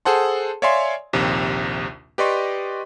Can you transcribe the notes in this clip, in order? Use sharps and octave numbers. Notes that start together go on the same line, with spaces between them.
G#4 A4 C5 F#5 A5 C6
C#5 D5 E5 F5 G#5 C6
A#1 D#2 C3
G4 B4 D5 D#5 C6 C#6